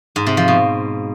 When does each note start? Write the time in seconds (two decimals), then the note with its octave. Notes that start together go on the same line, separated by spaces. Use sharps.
0.16 G#2
0.27 C3
0.37 F3
0.48 B2